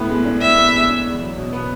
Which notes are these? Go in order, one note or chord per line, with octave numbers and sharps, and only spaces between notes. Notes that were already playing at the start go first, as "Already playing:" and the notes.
Already playing: A2 B3
G#3
D4
A2 E5
B3
G#3
D4
E2
F#3
B2
B3